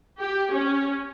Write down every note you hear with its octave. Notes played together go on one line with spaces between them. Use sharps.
G4
C#4